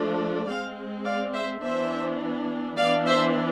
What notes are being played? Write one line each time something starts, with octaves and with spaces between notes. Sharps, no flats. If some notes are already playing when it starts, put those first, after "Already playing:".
Already playing: F3 A3 D4
G#3 C4 D5 F5
D5 F5
C5 E5
E3 B3 D4 C5 E5
E3 B3 D4 D5 F5
C5 E5